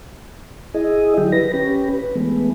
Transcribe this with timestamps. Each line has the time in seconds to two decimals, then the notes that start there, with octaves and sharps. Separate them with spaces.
0.74 E4 G#4 D#5
1.18 D3 F#3 E4 G4
1.32 B4 A#6
1.53 C#4 G4 B4
1.99 B4
2.15 E3 G#3 A3 B3